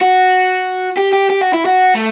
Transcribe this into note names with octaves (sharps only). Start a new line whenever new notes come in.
F#4
G4
G4
G4
F#4
E4
F#4
A3